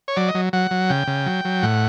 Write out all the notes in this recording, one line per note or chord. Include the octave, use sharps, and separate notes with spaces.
C#5
F#3 D5
D#5
F#3
F#3 F#5
F#3
C#3 G5
C#3
F#3
F#3
A2 F#5